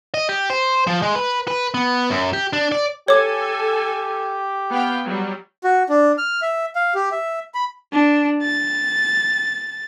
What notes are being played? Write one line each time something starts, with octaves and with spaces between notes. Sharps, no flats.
D#5
G4
C5
F3
G#3
B4
B4
B3
F#2
G4
D4
D5
G4 A4 C#5 G#5 D6
B3 F5 G5
F#3 G3
F#4
D4
F6
E5
F5
G4
E5
B5
D4
A6